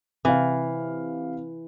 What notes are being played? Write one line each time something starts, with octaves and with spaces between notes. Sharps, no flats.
C3 E3 F5